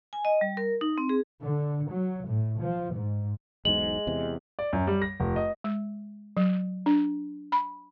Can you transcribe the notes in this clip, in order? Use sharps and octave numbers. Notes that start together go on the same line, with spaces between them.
G#5
D#5
G3
A#4
D#4
C4
G#4
D3
F#3
A2
F3
G#2
E1 B1 G#2 G#3 F#7
E2 C3
D5
F#2
G3
A#6
F1
D#5
G#3
F#3
D4
B5